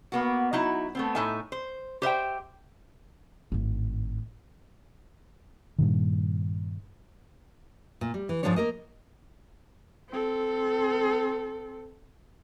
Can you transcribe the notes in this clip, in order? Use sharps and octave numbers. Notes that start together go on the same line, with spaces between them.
A#3 B3 F#4
F#3 D#4 E4
A3 B3 C4
A2 D#4 A4 E5 G#5
C5
G4 C5 E5 G5
G#1 A2
G2 A#2 D#3
A#2
G3
E3
G#2 D3 F3 G#3 D4 C#5
A#3 A#4 D#5
C4 A4